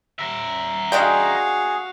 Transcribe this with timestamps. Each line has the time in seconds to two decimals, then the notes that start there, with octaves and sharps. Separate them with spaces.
0.19 A#4 E5
0.92 G#3 D4 F#4 G#4 F5 G5